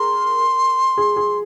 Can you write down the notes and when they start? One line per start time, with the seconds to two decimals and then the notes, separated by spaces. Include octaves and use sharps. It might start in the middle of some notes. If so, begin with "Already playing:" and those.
Already playing: G#4 A#4 C6
0.98 G#4
1.16 G#4